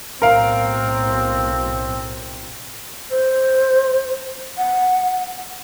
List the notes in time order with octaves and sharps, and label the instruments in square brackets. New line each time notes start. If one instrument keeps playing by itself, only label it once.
[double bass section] B1 A2 [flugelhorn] C4 [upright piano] A#4 F5
[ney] C5
F#5